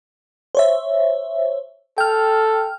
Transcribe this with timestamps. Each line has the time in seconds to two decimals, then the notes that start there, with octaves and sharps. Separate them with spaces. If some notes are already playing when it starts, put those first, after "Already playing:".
0.55 C5 C#5 E5
1.98 A4 G5 F6